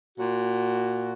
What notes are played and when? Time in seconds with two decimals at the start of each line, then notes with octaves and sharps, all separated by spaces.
0.18 A#2 F#4